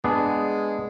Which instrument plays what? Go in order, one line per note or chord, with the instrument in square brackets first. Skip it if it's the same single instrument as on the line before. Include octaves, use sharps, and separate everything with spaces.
[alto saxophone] G#3 [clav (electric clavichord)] B3 D4 G#4